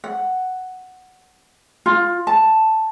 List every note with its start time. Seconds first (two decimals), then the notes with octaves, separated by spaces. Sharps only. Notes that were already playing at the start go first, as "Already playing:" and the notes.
0.04 F#5
1.86 F4
2.27 A5